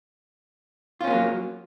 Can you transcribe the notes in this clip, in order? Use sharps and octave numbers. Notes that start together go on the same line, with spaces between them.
F#3 A#3 B3 C#4 F4